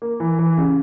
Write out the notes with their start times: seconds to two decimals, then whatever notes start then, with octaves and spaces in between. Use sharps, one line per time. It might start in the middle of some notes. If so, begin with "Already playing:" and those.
0.02 A#3
0.20 E3
0.39 E3
0.57 C#3